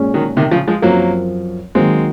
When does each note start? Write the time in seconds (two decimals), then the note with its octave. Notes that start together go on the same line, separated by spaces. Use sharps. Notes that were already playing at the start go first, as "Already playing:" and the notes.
Already playing: A#2 G#3 C#4
0.14 D#3 F#3
0.37 C3 D#3
0.51 C#3 F3
0.68 F3 G#3
0.82 F#2 F3 F#3 A#3 C4 F4 A#4
1.75 D#3 F#3 G#3 A#3 C4